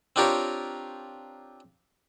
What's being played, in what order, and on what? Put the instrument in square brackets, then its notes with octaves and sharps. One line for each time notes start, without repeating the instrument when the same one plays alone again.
[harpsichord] C4 D4 F4 G4 A#4 C#5